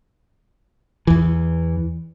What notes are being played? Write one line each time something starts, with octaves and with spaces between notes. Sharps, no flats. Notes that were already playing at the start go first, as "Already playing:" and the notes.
E2 E3